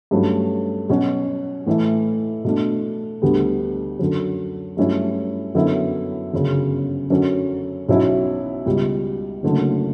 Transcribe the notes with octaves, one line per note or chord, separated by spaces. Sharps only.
G2 F#3 A3 C#4
B2 F#3 C#4 F#4
A2 E3 A3 E4
B2 A3 D4
D2 D3 G3 B3
F#2 D3 F#3
G2 F#3 A3 C#4 E4
F#2 D3 F#3 B3 E4
G1 F#2 C#3
F#2 D3 F#3 C#4
B1 B2 F#3 C#4 E4
C#2 B2 G3
F#1 F#2 D3 A3